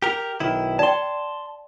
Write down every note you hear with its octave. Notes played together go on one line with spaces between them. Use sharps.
G4 A#4
B1 D#3 E4
D5 G5 A5 C6